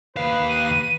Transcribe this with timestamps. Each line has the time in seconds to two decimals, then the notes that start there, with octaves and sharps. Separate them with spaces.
0.17 D#2 B4 F5
0.49 D#7